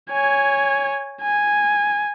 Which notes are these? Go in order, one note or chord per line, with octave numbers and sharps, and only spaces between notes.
C#5 G#5
G#5